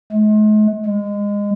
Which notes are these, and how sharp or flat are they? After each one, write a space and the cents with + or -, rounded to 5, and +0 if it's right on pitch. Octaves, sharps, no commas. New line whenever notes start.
G#3 +45
G#3 -20